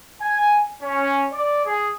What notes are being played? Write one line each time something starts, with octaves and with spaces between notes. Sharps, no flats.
G#5
C#4
D5
G#4